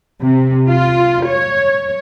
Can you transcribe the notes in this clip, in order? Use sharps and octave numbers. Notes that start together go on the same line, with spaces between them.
C3
F4
C#5